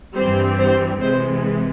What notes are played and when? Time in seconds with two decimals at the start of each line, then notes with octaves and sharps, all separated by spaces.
0.16 G2 E3 G3 C4 C5
0.59 C5
1.01 C3 E3 G#3 C5